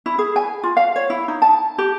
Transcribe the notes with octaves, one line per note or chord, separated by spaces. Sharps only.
E4
G#4
G#5
F4
F5
C#5
E4
D#4
A5
G4